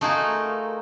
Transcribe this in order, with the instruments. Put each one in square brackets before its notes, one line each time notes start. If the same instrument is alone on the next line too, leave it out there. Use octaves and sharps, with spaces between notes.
[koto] A3 D#4 F4 F#4 G#4 A#4